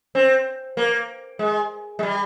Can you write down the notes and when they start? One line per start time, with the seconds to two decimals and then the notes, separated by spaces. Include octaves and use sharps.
0.15 C4
0.77 A#3
1.39 G#3
1.99 G#3
2.03 G3